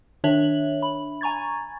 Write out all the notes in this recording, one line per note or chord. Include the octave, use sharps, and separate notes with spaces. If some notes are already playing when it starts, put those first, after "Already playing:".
D#3 D4 C#5 E5 F#7
B5
G#5 A#5 C#6 G#6 A6